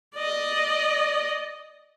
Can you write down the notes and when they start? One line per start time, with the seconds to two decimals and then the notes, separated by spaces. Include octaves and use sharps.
0.15 D5 D#5